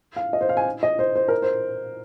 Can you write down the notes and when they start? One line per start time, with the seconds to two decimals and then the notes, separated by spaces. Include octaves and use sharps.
0.16 F5
0.33 D#5
0.41 C5
0.49 F5
0.57 G#5
0.83 D#5
0.99 C5
1.15 C5
1.28 A#4
1.42 C5